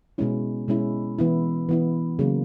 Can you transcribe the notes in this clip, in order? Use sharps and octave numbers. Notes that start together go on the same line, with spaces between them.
B2 G#3 C#4 E4
B2 G#3 C#4 E4
E3 B3 E4
E3 B3 E4
C#3 F#3 A#3